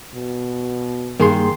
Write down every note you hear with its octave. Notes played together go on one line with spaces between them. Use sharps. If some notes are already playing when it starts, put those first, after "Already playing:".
B2
G2 D#3 A#3 G#4 C6